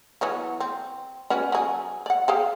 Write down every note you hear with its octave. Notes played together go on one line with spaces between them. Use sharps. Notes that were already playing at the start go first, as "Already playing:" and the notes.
E3 F#3 B3
C4
C#4 F#4 B4
F#3 G#4
D5 F#5
G4 G#4 F5